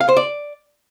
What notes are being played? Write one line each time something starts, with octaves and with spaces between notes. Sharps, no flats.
F5
C5
D5